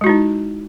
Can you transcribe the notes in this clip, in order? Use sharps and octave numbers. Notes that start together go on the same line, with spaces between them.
G#3 D#4 E4 F#4